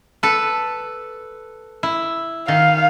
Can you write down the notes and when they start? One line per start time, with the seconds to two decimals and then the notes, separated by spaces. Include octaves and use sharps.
0.23 A4 B4
1.83 E4
2.48 D#3 F5